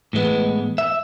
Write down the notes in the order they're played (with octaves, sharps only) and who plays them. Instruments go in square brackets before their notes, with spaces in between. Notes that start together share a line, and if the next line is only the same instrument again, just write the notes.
[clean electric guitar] A2 E3 G#3 B3
E5